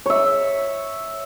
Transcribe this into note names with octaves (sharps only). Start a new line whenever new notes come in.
C#5 E5